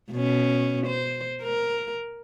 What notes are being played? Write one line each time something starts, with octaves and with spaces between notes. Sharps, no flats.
B2 C#4
C5
A#4